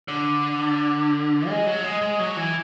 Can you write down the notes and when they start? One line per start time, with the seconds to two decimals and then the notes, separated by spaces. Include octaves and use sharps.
0.08 D3
1.49 G#3
1.66 F#3
1.84 G#3
2.02 G#3
2.19 F#3
2.37 E3